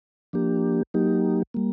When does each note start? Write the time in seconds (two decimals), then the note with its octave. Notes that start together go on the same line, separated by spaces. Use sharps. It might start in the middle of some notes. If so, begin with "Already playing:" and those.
0.33 F3 A#3 D4 G4
0.94 F#3 A#3 D#4 G4
1.54 G3 A#3